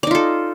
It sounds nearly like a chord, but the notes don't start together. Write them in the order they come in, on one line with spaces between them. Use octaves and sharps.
D5 D#4 F4 A4